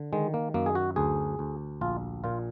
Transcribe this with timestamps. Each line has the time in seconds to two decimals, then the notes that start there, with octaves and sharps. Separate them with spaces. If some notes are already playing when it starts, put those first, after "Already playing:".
Already playing: D3
0.13 D#3 G#3
0.34 A#3
0.54 F#2 A#3
0.66 G#4
0.75 F#4
0.96 D2 G#4
1.39 D2
1.81 A#1 F4
2.24 A#2 F4